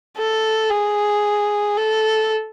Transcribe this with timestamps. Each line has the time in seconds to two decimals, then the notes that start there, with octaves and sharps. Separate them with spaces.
0.17 A4
0.71 G#4
1.77 A4